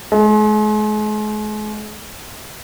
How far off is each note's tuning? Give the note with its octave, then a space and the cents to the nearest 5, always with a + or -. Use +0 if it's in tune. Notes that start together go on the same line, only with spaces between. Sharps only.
G#3 +40